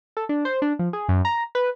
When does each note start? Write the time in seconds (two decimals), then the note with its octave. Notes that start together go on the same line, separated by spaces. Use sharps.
0.17 A4
0.29 D4
0.45 C5
0.62 D4
0.79 F3
0.93 G#4
1.09 F#2
1.25 A#5
1.55 B4